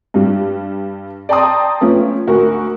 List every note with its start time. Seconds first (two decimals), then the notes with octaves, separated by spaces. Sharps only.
0.14 G2 G3
1.29 D5 G5 A5 A#5 C6 D#6
1.81 F3 A3 B3 C#4
2.27 D2 F#4 A#4